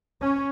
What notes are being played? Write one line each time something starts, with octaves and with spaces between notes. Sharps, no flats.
C#4